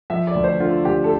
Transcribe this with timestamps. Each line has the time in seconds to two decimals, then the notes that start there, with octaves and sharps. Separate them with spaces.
0.10 F3 E5
0.27 D5
0.35 D2
0.44 C5
0.60 D3 F4
0.85 D2 G4
1.04 A4